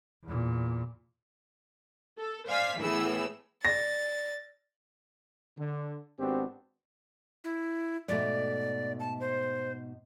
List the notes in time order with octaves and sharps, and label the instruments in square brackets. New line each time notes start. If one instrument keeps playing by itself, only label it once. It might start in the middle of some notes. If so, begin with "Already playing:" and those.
[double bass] E2 A#2
[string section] A4
C5 D5 F5 G#5 G#6 B6
A2 E3 B3 G#4 E6
[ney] D5 [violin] A6 [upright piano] A#6
[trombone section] D3
G#1 B3 C4 D4 F#4 G4
[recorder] E4
[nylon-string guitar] G#2 B2 A3 [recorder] D5
[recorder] A5
C5